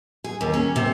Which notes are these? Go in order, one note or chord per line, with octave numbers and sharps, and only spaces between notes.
G#4
D#2
C#4
C3